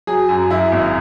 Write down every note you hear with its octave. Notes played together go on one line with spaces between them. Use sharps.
F#3 G#4
F#2
F#2 E4
G#1